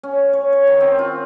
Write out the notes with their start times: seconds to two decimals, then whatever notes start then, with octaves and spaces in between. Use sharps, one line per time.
0.03 C#4
0.33 C#5
0.52 C#5
0.67 D#3
0.80 C4
0.99 F4